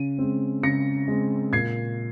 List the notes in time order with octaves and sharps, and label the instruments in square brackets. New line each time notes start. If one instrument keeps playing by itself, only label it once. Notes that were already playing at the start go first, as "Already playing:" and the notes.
Already playing: [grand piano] C#3 D#7
G#3 C4
C#3 A#6 C#7
G#3 C4
A#2 G#6 C7